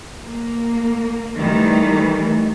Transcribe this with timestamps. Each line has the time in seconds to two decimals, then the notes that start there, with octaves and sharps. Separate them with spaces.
0.24 A#3
1.37 D#3 E3 G3 A3